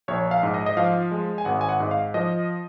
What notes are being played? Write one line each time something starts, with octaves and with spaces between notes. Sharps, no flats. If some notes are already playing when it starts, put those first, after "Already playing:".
A#1 C#5
F5
G#2
D#5
D#5
F3 F5
G#3
G#5
G#1 F#5
G#5
F#5
G#2
F5
F3 D#5